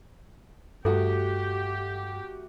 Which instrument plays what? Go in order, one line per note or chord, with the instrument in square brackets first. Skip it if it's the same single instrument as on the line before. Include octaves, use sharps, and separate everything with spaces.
[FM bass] G2 [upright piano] A3 F#4 [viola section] G4 [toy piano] A4